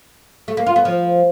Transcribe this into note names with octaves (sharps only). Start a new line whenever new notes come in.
A3
A#3
F4
B3
F3